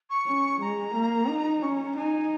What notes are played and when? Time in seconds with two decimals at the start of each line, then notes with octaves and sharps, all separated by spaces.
0.10 C#6
0.27 C#4
0.61 G#3 A#5
0.95 A#3
1.28 D#4
1.62 C#4 C#6
1.74 A#5
1.85 A#5
1.96 D#4 G#5